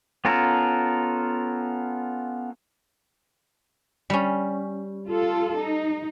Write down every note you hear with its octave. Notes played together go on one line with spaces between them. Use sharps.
B3 C#4 F4 A4 A#4
G3 C#4
F4 A4
D#4